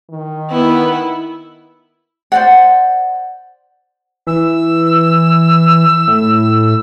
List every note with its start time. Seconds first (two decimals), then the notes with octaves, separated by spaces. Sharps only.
0.11 D#3
0.51 B3 E4
2.32 C5 D5 F#5
4.27 E3 E6
6.08 A2